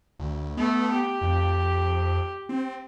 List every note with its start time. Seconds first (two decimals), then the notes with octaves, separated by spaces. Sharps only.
0.19 D2
0.57 A3 B3
0.91 G4
1.21 F2
2.49 C4